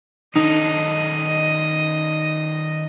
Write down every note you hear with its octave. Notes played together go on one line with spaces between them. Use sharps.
D#3 C#4 D#4 A4 D#5